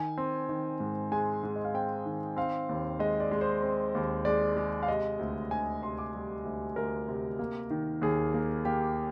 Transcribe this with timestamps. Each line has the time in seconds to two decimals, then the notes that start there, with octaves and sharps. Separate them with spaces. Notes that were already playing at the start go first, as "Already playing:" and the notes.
Already playing: D#3 G#5
0.18 C4
0.49 D#3
0.80 G#2
1.12 G#3 G#5
1.43 G#2
1.56 D#5
1.65 F5
1.74 C4 G5
2.06 D#3
2.36 C4 F5
2.69 D#2
2.99 G#3 D#5
3.20 D5
3.31 G#3
3.41 C5
3.62 C4
3.95 D#2
4.25 G#3 D5
4.57 G#3
4.83 F5
4.88 C3 D#5
5.19 D2
5.51 D2 G#5
5.83 C3 C6
5.98 D6
6.14 G3
6.45 D2
6.76 D2 A#4
7.09 C3
7.39 A#3
7.71 D#3
8.02 D#2 G#4
8.34 A#3
8.65 A#3 G4